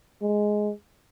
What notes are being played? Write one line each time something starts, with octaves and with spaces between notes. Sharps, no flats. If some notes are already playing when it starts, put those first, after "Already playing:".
G#3